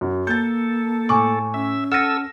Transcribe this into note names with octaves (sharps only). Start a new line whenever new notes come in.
F#2
A#3 A4 G6 A6
A2 G#5 C#6 D6
C#4 E5
A4 F#5 E6 F6 A#6 C#7 D#7